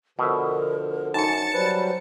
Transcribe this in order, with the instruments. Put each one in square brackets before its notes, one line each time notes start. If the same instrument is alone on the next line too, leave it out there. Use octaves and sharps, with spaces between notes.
[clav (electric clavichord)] B2 E5 [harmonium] D3 F3 [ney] A#4
[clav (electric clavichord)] F#2 [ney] D#4 [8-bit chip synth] A5 C#7
[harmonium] F#3 G3 B4 [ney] C5